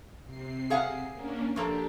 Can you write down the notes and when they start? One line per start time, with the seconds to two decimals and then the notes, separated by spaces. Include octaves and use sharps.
0.25 C3 C7
0.70 G#4 F5 F#5
1.12 A#3 C#4 D4
1.56 F3 A#3 D4 G4 A4